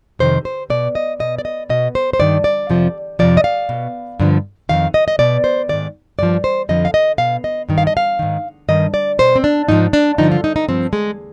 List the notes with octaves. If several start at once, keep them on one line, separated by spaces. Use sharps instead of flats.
F2 C3 D#3 C5
C5
B2 D5
D#5
B2 D#5
D5
D#5
B2 D#5
C5
C5
G2 D#3 D5
D5
F2 C3 F3
F2 C3 F3 D5
D#5
F5
B2
G2 D3 F3
F2 C3 D#3 F5
D#5
D#5
B2 D5
C5
G#2 D#3 D5
G2 F3 D5
C5
F2 D3 F3 D#5
F5
D#5
B2 F5
D#5
G2 D#3
F5
D#5
F5
G#2 D#3
G2 D#3 D#5
D5
B2 C5
C4
D4
G#2 F3 D#4
D4
G2 D3 F3 D#4
F4
D#4
D#4
G2 F3 C4
G#3